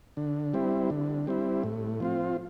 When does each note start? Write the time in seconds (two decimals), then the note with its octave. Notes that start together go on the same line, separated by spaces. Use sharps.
0.17 D3
0.54 G3 C4 E4
0.90 D3
1.27 G3 C4 E4
1.63 A2
2.00 F3 C4 F4